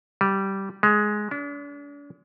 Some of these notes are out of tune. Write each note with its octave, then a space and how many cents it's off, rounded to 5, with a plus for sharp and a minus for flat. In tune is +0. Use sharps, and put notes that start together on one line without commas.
G3 -10
G#3 +10
D4 -40